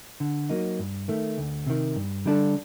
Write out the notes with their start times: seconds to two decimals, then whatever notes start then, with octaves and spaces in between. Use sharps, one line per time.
0.20 D3
0.50 F#3 A#3 D#4
0.79 G2
1.08 D#3 A3
1.38 D2
1.67 C3 D#3
1.96 G2
2.25 D3 G3 D4 A4